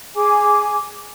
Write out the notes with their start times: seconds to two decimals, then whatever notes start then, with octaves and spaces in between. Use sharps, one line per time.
0.16 G#4 G#5 D6